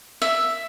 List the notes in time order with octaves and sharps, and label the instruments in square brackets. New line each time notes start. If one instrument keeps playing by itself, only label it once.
[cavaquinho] E5